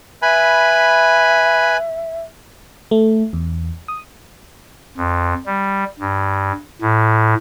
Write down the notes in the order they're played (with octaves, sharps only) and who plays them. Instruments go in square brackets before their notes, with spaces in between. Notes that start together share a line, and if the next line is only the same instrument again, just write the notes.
[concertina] B4 G#5 B5 [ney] E5
[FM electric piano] A3
E2
D#6
[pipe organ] F2
G3
G2
A2